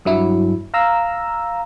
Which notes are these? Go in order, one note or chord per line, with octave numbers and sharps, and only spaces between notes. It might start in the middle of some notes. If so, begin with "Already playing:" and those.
G2 F#3 E4
F5 A#5 E6